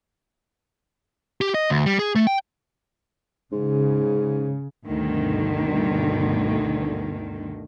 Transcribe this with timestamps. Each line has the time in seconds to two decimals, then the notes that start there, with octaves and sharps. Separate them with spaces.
1.41 G4
1.54 D#5
1.70 D2
1.86 G3
1.99 G#4
2.15 A3
2.27 G5
3.52 G#2 C#3
4.87 D2 G2 B2 D3 D#3